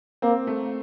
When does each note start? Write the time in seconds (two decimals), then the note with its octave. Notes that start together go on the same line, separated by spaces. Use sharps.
0.22 A#3 C4
0.47 A3